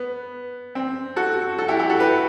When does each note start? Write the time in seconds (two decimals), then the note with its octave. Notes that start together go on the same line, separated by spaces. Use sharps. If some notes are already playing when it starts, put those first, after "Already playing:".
Already playing: B3
0.75 C4
1.16 F#4 A4
1.58 F#4 A4
1.68 E4 G4
1.79 E4 G4
1.90 F#4 A4
1.99 G4 B4